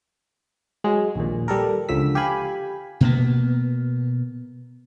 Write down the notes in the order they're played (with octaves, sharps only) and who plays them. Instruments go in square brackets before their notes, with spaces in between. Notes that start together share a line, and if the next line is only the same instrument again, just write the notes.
[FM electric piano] F#3 G#3
A#1 D#2 A#2
G3 A4 A#4
C#2 D3 F3 E6 B6
G4 F5 G#5 B5
[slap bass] B2 A#3 B3